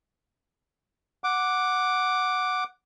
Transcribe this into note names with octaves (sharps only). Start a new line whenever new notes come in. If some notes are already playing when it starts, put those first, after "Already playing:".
F#5 D6